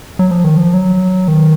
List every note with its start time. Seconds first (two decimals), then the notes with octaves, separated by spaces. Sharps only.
0.19 F#3
0.31 F3
0.44 D#3
0.57 F3
0.74 F#3
1.28 D#3